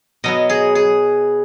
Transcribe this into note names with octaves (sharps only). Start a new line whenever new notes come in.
B2 F#3 B3 D#5
G#4
G#4